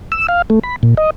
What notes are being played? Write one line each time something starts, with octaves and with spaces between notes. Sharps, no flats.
E6
F5
A3
B5
A#2
D#5